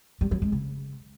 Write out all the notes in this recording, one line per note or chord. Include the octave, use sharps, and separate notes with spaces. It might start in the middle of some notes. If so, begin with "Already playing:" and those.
G3
F#3
G#3
C#3